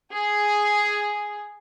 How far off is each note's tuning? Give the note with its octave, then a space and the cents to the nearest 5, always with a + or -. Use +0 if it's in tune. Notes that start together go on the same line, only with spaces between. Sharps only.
G#4 +0